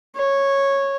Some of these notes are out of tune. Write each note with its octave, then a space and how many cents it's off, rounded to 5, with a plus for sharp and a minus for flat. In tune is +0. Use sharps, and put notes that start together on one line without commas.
C#5 -10